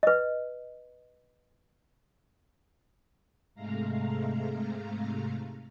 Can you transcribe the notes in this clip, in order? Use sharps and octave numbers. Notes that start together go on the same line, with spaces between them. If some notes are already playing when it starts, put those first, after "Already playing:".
B4 D#5
G#2 C3 G#3 A3 F5 A#5